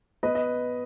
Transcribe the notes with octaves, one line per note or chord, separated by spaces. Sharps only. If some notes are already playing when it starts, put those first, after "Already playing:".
B3 B4 D#5
D#5